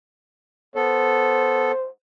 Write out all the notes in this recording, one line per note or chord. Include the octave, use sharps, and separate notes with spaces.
B3 A4 C5